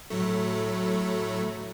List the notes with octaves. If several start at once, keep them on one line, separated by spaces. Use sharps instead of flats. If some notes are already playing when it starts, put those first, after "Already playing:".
A2 F#3 A3